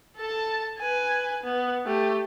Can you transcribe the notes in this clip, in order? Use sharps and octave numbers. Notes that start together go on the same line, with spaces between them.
A4 A5
B4 G#5
B3
A3 G4